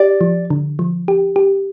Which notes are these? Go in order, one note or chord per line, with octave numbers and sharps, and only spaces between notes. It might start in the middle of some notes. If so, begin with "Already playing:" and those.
Already playing: G4 D5
F3
D3
F3
G4
G4